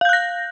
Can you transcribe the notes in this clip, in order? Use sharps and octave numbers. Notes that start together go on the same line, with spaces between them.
F5 F#6 G6 A#6